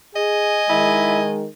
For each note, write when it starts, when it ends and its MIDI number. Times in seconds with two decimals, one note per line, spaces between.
0.16 0.62 68
0.16 1.32 75
0.16 1.36 80
0.69 1.47 51
0.69 1.47 56
0.69 1.21 64